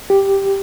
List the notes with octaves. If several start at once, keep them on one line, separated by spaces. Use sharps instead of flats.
G4